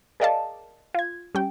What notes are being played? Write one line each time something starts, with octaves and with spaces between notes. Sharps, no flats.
G#4 A#4 D5 D#5 F5 A5
F4 G#6
G3 C#4 G5